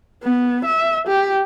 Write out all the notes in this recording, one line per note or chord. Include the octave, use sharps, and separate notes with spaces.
B3
E5
G4